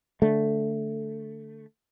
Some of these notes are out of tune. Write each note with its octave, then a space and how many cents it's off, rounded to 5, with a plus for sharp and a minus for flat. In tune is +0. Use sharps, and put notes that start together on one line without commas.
D3 -5 A3 +5